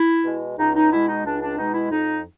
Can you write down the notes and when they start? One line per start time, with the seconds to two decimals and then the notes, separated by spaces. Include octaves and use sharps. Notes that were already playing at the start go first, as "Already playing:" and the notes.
Already playing: E4
0.25 B2 G#3
0.58 C#2 D#4
0.75 D#4
0.91 B2 G#3 E4
1.08 D#4
1.24 C#2 D4
1.41 D4
1.57 B2 G#3 D#4
1.74 E4
1.91 F2 D#4